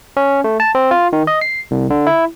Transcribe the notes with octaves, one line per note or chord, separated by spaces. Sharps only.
C#4
A3
A5
C4
F4
D#3
D#5
C7
C2
D3
E4